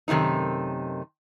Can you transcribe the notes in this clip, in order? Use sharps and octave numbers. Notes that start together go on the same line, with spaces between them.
F#2 C3 D#3 A3 D#4